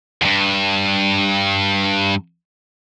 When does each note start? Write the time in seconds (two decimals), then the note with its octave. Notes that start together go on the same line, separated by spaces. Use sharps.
0.22 E2 G2